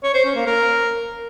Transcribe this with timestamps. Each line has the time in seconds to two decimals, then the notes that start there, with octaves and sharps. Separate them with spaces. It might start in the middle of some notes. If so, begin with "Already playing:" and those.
0.03 C#5
0.14 C5
0.25 C#4
0.35 A#3
0.46 A#4